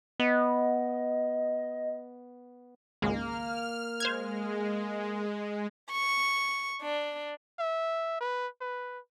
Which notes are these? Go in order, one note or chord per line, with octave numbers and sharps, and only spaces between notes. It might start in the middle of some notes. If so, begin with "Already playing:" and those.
B3 D#5
G#1 C#2 G#3 A#3 F6
G#3 C5 F6 G#6
C#6
D4
E5
B4
B4